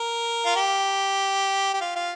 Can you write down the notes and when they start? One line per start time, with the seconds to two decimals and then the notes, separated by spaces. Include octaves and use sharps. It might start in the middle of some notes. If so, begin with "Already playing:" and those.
Already playing: A#4
0.45 F4
0.56 G4
1.74 G4
1.81 F4
1.96 F4